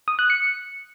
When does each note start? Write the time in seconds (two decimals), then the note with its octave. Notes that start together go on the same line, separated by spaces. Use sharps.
0.08 D#6
0.19 F#6
0.30 C#7